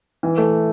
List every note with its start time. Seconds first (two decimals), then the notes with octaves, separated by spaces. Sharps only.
0.23 E3
0.38 A3